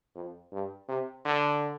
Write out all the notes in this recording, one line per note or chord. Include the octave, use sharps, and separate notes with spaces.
F2
G2
C3
D3